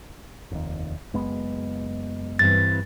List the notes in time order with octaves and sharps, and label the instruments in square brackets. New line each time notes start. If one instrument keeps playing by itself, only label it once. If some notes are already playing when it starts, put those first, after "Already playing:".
[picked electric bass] F1 D#2
F#1 G#3 B3
[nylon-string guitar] G2 E3 C4 [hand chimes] A6